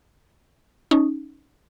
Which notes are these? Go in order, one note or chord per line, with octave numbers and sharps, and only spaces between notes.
C#4 D#4